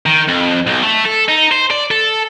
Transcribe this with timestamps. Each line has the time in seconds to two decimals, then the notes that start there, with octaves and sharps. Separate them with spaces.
0.06 D#3
0.28 F2
0.67 B1
0.83 A3
1.06 A4
1.29 D#4
1.52 C5
1.71 D5
1.91 A4